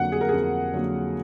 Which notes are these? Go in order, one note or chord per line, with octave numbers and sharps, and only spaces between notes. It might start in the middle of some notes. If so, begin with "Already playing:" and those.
Already playing: F2 D3 F#3 A#3 F#5
G#4
A#4
F2 G#4
D3 F#3 A#3